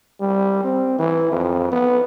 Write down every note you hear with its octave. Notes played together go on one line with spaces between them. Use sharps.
G3
C4
E3
F2
B3